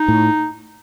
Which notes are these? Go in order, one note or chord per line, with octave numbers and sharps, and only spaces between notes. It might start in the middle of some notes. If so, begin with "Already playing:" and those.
Already playing: D#4
A2